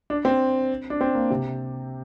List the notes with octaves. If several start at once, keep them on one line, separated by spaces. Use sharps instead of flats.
D4
C4
D4
C4
A#3
C3